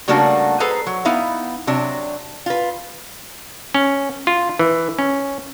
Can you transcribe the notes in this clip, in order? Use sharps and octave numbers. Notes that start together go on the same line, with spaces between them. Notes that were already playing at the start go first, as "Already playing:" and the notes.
C#3 G3 A3 A#3 D4 F#4
G#4 A4 B4 C5 A#5
F#3
B3 D#4 E4 E5 F5
C3 F#3 D4
F4 B4
C#4
F4
E3
C#4